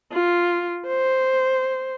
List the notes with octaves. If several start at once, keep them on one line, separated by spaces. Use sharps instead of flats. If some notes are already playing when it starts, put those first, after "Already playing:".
F4
C5